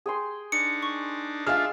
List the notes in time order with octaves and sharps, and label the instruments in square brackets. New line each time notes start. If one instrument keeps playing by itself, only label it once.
[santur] G#4 G5 C6
[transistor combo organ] D4 D#4 [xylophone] C#7
[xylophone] C#6
[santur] G#3 [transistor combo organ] D4 F4 E5 [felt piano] F5 F6